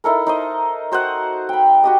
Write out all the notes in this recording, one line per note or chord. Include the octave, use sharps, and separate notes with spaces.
D#4 E4 A4 A#4
D#4 C5 D#5
F#4 C5 D#5 F#5
G5 B5
F#4 G4 D#5